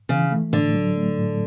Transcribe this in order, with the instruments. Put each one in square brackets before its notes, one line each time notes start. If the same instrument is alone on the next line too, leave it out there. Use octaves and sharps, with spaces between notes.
[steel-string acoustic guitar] C#3 [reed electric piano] E3
[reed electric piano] A3
[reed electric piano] A2 [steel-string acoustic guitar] D3
[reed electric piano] F#3
A3
A2